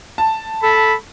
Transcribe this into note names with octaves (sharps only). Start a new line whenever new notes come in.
A5
A4 B5